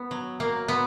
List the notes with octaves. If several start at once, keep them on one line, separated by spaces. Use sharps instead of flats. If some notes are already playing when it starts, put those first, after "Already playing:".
Already playing: B3
F#3
F#3 A#3
A#2 B3